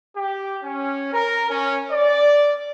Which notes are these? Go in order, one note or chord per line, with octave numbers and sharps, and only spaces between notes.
G4
C#4
A#4
C#4
D5